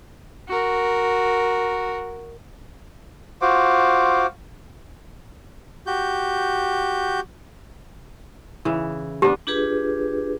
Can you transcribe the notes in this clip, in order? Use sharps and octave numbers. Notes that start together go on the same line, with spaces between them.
F#4 A#4
F4 F#4 C5 D6
F#4 G4 G6
C#3 E3
B3 D4 G4
D4 F4 G4 G#4 B4